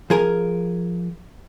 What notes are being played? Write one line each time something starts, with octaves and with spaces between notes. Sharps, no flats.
F3 G#4 A#4